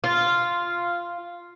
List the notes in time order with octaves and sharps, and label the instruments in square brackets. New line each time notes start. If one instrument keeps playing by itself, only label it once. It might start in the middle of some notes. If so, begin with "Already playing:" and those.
[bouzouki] F4